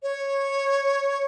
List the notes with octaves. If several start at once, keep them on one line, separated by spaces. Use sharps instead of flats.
C#5